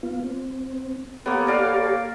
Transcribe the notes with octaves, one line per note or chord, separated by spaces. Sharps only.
B3 F4
C4
A#3 B3 G4 A4 C#5
A#4 D5 F5